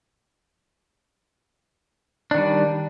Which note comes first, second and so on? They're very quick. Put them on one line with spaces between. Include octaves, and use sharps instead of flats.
D4 D#3 G3